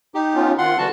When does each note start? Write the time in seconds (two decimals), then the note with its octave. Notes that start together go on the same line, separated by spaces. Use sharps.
0.14 D#4 G4
0.34 B3 C#4 F4
0.58 D#3 C4 F4 F#5 C6
0.78 D3 E3 G3 F#4 A5